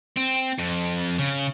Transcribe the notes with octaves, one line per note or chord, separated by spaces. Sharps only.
C4
F2
C#3